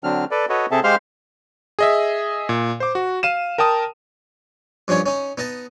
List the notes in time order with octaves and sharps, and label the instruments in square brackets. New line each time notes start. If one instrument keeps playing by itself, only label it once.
[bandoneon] D3 F#3 C4 D4 F6
A4 B4 D5
F#4 A4 B4 C#5 D#5
C3 C4 G#4 A4 E5 A5
G#3 G4 C5 F5 C6 F6
[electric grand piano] G#4 D#5 E5
A#2
C5 D6
F#4
F5 D#7 E7
A#4 G5 A5 D#6
[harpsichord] G2 F3 C#4 D#4 C#5
C#4 D#4
B3 D#4 D#5 A5